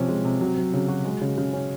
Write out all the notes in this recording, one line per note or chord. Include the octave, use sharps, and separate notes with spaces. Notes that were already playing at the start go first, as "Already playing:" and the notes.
Already playing: C3 F3 C#4
G#3
C3
F#3
F#3
C#3
F#4
G#3
C#3
C#3
C#4